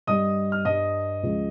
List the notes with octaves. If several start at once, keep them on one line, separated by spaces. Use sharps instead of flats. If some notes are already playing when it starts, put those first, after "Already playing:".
G2 G3 D#5 D#6
F6
G2 G3 D#5 D#6
C#2 C#3 F3 G#3